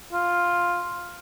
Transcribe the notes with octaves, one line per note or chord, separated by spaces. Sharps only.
F4